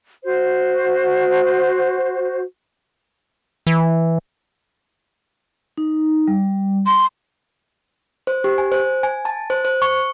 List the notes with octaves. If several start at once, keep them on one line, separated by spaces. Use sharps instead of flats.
F#4 C5
E3
D#4
G3
C6
C5
G4
G#5
C5
G#5
A5
C5
C5
C#6